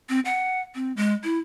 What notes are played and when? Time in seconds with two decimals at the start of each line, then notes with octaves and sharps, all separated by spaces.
0.09 C4
0.25 F#5
0.75 C4
0.97 G#3
1.24 E4